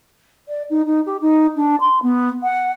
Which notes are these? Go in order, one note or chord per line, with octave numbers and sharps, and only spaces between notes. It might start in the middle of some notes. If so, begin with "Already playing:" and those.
D5
D#4
D#4
G4
D#4
D4
C6
B3
F#5